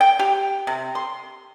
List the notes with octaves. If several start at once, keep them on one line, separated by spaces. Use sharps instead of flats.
G5
G4
C3
C6